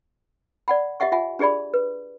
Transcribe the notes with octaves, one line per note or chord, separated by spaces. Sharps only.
D5 F#5 B5
G4 D#5 E5 F#5 C#6
F4 E5 F#5 G#5
D4 G4 G#4 D5 B5
B4